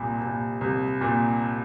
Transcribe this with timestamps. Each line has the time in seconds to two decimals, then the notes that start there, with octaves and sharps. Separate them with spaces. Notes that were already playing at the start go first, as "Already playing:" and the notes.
Already playing: C2 A#2
0.22 A#2
0.61 C2
1.01 A#2